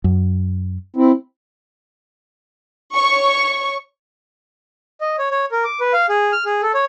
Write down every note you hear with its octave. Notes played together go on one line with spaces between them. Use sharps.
F#2
C4 E4
C#5 C#6
D#5
C#5
C#5
A#4
D6
B4
F5
G#4
F6
G#4
A4
C#5